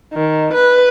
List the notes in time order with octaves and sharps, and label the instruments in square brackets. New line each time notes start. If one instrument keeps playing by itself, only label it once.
[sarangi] D#3
B4